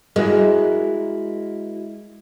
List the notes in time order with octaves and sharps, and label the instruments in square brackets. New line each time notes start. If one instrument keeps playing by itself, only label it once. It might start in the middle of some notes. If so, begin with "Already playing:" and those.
[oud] G#3 [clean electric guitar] E4 F#4 A#4